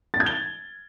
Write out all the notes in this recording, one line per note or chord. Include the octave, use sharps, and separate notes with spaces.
A6
G#6
G7